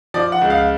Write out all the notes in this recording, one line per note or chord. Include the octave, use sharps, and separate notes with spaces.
F3 D5
F#5
C#2
F5